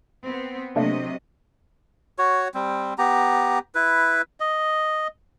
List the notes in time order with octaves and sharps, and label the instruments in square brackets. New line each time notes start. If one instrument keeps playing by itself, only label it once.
[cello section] B3 C4
[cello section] C3 F#3 D#5 [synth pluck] A3 A#3 D4
[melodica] F#4 C#5
G3 C4
B3 G4 A#5
E4 B4
D#5